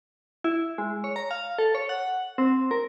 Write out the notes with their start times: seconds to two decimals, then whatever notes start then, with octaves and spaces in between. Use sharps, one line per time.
0.44 E4
0.78 G#3
1.04 C#5
1.16 A#5
1.31 F5
1.59 A4
1.75 C#5
1.89 F#5
2.38 C4
2.71 A#4